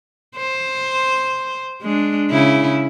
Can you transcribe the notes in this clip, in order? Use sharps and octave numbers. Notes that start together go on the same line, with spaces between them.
C5
G#3 D4
C#3 E4